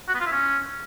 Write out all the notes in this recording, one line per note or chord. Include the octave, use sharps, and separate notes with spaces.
F#4
B3
F4
E4
C#4